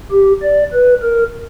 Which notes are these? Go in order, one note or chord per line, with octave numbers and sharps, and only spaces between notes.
G4
D5
B4
A#4